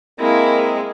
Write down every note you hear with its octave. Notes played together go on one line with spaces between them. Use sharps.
G#3 A#3 C4 E4 A#4